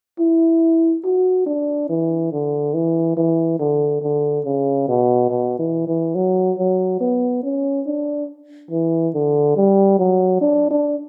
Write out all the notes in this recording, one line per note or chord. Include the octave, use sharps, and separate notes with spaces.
E4
F#4
D4
E3
D3
E3
E3
D3
D3
C#3
B2
B2
E3
E3
F#3
F#3
B3
C#4
D4
E3
D3
G3
F#3
D4
D4